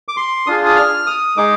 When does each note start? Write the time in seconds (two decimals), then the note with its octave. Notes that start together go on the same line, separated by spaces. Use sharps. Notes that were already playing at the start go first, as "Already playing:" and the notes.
0.08 D6
0.17 C6
0.47 D4 F4 G#4 D#6
0.65 D#6
0.76 F6
1.06 D#6
1.36 G#3 D#4 G#4 D6